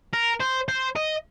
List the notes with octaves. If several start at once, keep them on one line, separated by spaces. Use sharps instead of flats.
A#4
C5
C5
D#5